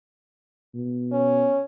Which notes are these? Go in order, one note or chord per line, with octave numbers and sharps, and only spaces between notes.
B2
C#4